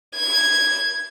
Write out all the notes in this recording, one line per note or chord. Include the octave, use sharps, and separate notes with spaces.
G#6